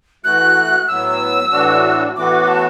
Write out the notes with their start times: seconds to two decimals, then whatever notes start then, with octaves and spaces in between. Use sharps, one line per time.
0.24 E3 A3 F#4 F#6
0.88 A2 F#3 B3 E6
1.52 A2 E3 D4 F#4
2.15 A2 E3 B3 F#4 D6
2.48 A5